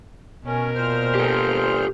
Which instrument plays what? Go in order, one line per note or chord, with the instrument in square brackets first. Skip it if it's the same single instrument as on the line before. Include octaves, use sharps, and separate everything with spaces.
[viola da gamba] B2 A#4 [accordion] C#4
[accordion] A#2 C5 F6
[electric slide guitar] G4 A4